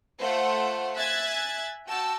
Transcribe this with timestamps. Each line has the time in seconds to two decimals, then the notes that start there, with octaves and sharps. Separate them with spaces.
0.20 A3 F4 C5 F#5
0.97 E5 G#5 F#6 G#6 A6
1.87 F#4 G5 A5 E6